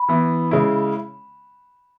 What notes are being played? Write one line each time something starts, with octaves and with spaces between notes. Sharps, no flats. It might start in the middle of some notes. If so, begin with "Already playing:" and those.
Already playing: B5
E3 B3 E4
C#3 G#3 C#4 E4